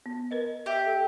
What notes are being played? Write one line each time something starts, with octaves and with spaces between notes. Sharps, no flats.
B3
A#4 B4 D#5
G4 E5
A4